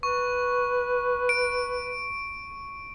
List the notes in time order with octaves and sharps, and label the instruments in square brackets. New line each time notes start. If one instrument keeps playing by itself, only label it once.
[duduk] B4 [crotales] C#6
[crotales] D7